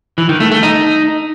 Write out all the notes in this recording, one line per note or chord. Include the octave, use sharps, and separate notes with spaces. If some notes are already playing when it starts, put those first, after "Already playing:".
E3
D#3
A3
A3
D#4